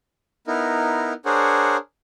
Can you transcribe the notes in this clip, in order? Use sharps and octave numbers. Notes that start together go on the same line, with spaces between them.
B3 D#4 E4 A#4
D4 G#4 A#4 C5 C#5 F#5